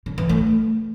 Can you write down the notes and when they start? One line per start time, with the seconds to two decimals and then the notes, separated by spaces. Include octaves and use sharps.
0.06 D3
0.18 E3
0.29 A3